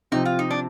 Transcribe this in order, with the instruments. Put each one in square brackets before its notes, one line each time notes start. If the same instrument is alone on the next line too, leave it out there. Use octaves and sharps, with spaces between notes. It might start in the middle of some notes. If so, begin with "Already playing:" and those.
[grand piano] C3 F3 C4 [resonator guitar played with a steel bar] D#4
[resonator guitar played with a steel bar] F4
D#4
D4